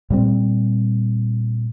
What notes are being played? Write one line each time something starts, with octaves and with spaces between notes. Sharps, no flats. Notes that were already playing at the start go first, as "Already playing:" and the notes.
A#2 G3 C4